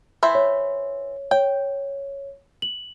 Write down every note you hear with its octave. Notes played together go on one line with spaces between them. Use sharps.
E3 C5 E5
C#5
C#5 G5
F#7